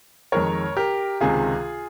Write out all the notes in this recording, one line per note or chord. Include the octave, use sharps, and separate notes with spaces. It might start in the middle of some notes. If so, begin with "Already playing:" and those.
F2 D#3 G#3 A#4 C#5
G4 A#4
C#2 C3 D#3 F4 G#4